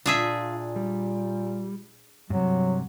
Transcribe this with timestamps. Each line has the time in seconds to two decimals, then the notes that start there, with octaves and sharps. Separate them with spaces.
0.06 A#2 D4 F4 G#4 E5
0.76 G3
2.30 G2 C3 F#3